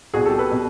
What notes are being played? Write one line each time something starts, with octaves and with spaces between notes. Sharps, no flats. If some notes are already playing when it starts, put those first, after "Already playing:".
C2 B2 F#4 G#4
G4 A4
A4 B4
B2